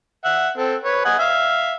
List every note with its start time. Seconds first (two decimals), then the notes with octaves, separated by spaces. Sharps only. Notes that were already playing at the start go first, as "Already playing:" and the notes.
0.24 E5 F#5
0.57 C4 A4
0.84 B4 C#5
1.05 D#5 F#5 G#5
1.19 E5 F5